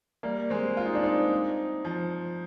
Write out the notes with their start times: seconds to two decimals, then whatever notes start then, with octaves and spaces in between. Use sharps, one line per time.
0.23 G3 A#3
0.50 G#3 C4
0.77 F4
0.86 D#4
0.95 D4
1.03 C4 D#4
1.85 F3